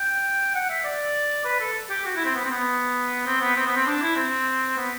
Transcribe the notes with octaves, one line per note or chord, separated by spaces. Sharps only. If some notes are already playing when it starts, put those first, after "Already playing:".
Already playing: G5
F#5
E5
D5
B4
A4
G4
F#4
E4
C4
B3
C4
B3
C4
B3
C4
B3
C4
D4
E4
C4
B3